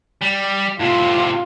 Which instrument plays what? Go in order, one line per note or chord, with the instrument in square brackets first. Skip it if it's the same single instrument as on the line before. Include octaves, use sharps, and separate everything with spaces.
[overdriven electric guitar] G3
[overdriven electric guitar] A2 C3 [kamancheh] F4